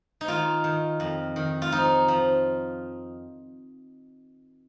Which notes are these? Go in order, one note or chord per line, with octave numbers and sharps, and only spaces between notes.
D#4
D#3 F4
D#3
F2
D#3
F4
F3 D#4
F3